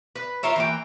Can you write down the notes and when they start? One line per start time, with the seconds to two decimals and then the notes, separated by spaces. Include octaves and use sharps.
0.16 B4
0.43 F4 A#4 C#5 E5
0.56 E3 A#3 G5